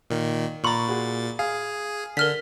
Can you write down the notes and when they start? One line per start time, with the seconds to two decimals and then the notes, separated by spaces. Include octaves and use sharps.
0.10 A#2 D#3
0.64 A#2 A#5 B5 C#6 A6
0.88 F#4 G#4
1.39 G#4 F5
2.17 D3 A#4 F6 B6